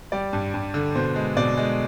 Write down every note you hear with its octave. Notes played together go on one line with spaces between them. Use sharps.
G3 D5
G2
G2
D3
B2 C5
G#3
B2 D5
G#3